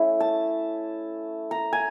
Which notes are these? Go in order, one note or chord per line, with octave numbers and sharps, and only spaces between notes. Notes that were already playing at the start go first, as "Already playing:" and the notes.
Already playing: A3 C#4 E4
A5
A#5
G#5